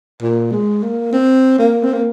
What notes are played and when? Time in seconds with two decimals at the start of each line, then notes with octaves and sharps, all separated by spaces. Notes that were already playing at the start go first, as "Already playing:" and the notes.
0.22 A#2
0.52 G#3
0.83 A#3
1.12 C4
1.59 A#3
1.83 C4
1.93 A#3